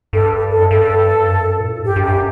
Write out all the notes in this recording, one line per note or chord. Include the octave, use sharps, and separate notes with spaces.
G2 A4
A4
F#2
G2 A4
F#2
A#2
A2
G#2
G2 G4
G2
F#2 G4